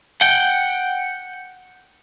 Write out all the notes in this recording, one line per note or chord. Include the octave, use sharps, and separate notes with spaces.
F#5 G5